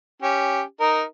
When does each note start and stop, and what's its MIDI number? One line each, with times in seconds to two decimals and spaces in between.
0.22 0.62 61
0.22 0.62 67
0.80 1.03 63
0.80 1.03 70